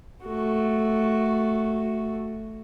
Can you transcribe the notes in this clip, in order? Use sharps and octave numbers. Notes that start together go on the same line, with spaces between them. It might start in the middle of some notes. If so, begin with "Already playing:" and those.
A3 F#4